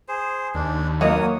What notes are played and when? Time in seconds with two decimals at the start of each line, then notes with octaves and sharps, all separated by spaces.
0.08 G#4 C5
0.55 D#2 D4
1.01 E3 F#3 A#3 A#4 C#5 D#5 D#6